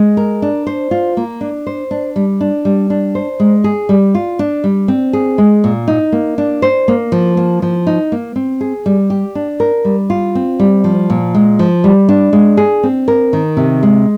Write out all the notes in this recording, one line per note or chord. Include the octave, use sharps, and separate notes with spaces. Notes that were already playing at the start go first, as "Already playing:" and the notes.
Already playing: G#3
A#4
D4
C5
F4
A#3
D4
C5
D4
G3
D4
G3
D4
C5
G#3
G#4
G3
F4
D4
G3
C4
G#4
G#3
A#2
D#4
A#3
D4
C5
A#3
F3
A#3
F3
D#4
A#3
C4
G#4
G3
G4
D4
A#4
G3
F4
C4
G3
F3
A#2
G#3
F3
G3
D4
G#3
G#4
C4
A#4
D#3
C3
G#3